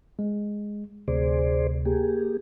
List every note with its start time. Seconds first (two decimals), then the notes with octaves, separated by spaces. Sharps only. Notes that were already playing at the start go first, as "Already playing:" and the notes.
0.19 G#3
1.08 D2 C3 G#4 C5 D5
1.85 A#3 G4 G#4